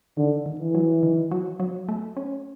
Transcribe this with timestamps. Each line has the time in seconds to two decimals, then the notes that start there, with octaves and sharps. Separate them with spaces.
0.17 D3 D#3
0.46 D#3
0.60 E3
0.75 F#3
1.03 D#3
1.31 F#3
1.60 F#3
1.88 A3
2.17 C#4